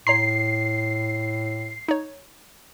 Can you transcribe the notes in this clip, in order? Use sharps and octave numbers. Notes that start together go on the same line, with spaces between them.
A2 C#5 A#5 C6 C7
D#4 C#5